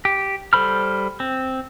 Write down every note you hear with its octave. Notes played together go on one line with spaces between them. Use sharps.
G4
G3 A4 C5 B5 F6
C4